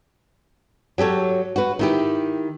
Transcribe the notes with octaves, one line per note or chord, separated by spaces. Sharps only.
F#3 G4 A4 C#5
F#4 B4
D#3 E4 G4